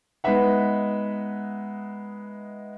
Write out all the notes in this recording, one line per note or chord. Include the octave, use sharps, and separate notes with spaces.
G#3 B3 D#4 B4 E5 F#5